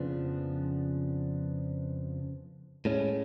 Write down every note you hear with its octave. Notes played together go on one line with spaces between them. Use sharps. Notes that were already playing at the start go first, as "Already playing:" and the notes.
Already playing: F2 C#3 F3 B3 D4
A2 G#3 C#4